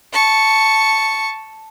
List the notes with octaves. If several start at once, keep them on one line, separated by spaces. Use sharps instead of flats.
A5 C#6